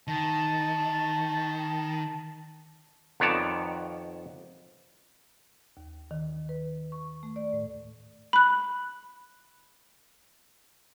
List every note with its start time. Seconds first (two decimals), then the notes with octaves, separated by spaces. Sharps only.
0.08 D#3 A5
3.20 F2 D#3 B3 C#5 D5 A5
5.77 D#2
6.11 D#3
6.49 B4
6.92 C#6
7.23 A3
7.36 D5
7.53 A2
8.33 B5 F#6